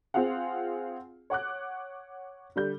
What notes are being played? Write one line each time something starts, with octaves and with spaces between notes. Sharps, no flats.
C4 F4 G#4 F5 F#5
C#5 F#5 D6 F#6
D3 G3 G6